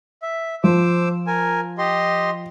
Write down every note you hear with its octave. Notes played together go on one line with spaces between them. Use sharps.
E5
F3 C5 D6 E6
A#4 G#5
G4 D#5 C6